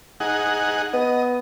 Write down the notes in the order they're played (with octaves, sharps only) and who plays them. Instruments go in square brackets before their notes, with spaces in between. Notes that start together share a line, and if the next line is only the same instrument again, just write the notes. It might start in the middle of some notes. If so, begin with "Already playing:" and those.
[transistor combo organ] D#4 G#4 F#5
[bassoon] B3 [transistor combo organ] D#5